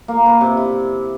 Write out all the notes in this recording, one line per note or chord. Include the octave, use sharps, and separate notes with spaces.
A#3
B4
C3
E4